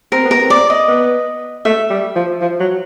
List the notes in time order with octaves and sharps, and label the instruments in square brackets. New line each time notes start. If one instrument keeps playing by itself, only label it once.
[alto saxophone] C4 [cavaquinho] A#4
[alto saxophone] B3
[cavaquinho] A#4
[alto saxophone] C4
[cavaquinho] D5
D#5
[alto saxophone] B3
[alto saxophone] A3 [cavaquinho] E5
[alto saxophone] G3
F3
F3
F#3